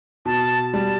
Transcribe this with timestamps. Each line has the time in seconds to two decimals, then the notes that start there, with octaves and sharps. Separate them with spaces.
0.26 B2 A5
0.73 G3 A5